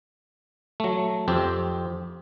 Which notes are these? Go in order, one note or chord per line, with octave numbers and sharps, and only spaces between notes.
F#3 A3
F2 C4 G4